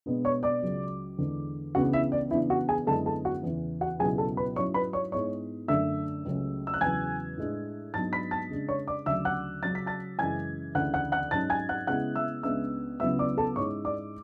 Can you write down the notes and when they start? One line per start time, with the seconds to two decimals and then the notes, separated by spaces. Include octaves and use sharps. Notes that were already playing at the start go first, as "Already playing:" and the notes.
0.06 B2 G#3 B3 D4
0.25 C#5 C#6
0.43 D5 D6
0.62 C#2 C#3 F#3
1.18 E2 D3 G#3
1.75 C#2 C#3 E3 B3 D4 F#4 F#5
1.93 E4 E5
2.12 D5
2.31 C#3 E3 B3 D4 E4 E5
2.50 F#4 F#5
2.69 G#4 G#5
2.87 F#2 D3 G#3 B3 E4 A4 A5
3.06 A4 A5
3.25 F#4 F#5
3.43 E2 C#3 E3
3.81 F#4 F#5
3.99 C#2 B2 F#3 B3 E4 G#4 G#5
4.18 A4 A5
4.37 B4 B5
4.56 G#2 F#3 C#4 E4 C#5 C#6
4.74 B4 B5
4.93 C#5 C#6
5.12 G#2 G#3 B3 E4 C#5 C#6
5.68 F#2 D3 A3 D4 E5 E6
6.25 C#2 C#3 F#3 A3 C#4
6.67 E6
6.74 F#6
6.81 E2 C#3 F#3 G#5 G#6
7.37 A2 G#3 D4
7.94 G#2 F#3 B3 D4 A5 A6
8.13 B5 B6
8.31 A5 A6
8.50 C#3 G#3 D4
8.69 C#5 C#6
8.88 D5 D6
9.06 D2 C#3 F#3 E5 E6
9.25 F#5 F#6
9.62 C#3 F#3 C#4 A6
9.75 B6
9.86 A5 A6
10.19 F#2 C#3 E3 G#3 G#5 G#6
10.75 D2 C#3 E3 F#5 F#6
10.94 F#5 F#6
11.12 F#5 F#6
11.31 G#2 F#3 C#4 A5 A6
11.50 G#5 G#6
11.69 F#5 F#6
11.87 C#3 G#3 B3 E4 F#5 F#6
12.16 E5 E6
12.43 C#2 C#3 G#3 B3 D4 E5 E6
13.00 C#2 C#3 F#3 B3 E4 E5 E6
13.19 D5 D6
13.37 A4 A5
13.56 G#2 G#3 C#4 E4 C#5 C#6
13.85 D5 D6